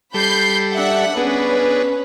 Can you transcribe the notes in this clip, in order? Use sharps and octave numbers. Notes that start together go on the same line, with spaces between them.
G3 A4 B5 G6 C7
D4 E5 F#5
B3 C#4 D4 G#4 B4